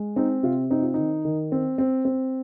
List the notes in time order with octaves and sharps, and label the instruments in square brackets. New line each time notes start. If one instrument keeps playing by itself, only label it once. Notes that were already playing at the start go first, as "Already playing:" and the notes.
Already playing: [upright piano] G#3
C4 D#4
C3 F4
C4 D#4
F4
D#3 D#4
D#3
C4
C4
C4